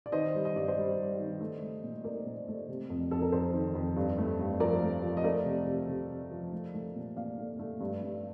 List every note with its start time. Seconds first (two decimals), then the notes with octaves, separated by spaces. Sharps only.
0.06 D5
0.12 D#3 C5 D#5
0.34 G3
0.45 D#5
0.56 G2 D5
0.68 C5 D#5
0.77 G3
0.98 G3
1.19 D#3
1.41 A3
1.62 A3
1.83 A#2
2.04 A3 A#4 D5
2.26 A#2
2.48 A3
2.68 C3
2.90 F2
3.11 F2 A4
3.22 A#4
3.32 F2 A4 C5
3.54 D#3
3.75 F2
3.96 G2
4.18 A3
4.39 G2
4.60 F3 A#4 D5
4.82 A3
5.03 F3
5.17 D#5
5.24 A3 A#4 D5
5.45 C3
5.67 C3
5.88 C3
6.10 C3
6.31 F3
6.52 A3
6.74 A3
6.95 A#2
7.17 A#2 D5 F5
7.38 A3
7.59 A3
7.80 G2
8.02 G2